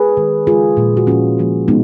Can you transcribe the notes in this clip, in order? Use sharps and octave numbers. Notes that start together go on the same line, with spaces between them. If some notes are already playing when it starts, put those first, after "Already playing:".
Already playing: G#4 B4
D#3 G#3
C#3 G#3 F4 G#4
A#2 F3 G#3
F#4
A#2 F3 A#3 C#4 F4
A#2 F3 A#3
B2 G#3 B3 D#4